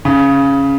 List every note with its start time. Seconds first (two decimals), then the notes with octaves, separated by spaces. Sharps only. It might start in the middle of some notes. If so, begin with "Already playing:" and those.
0.05 C#3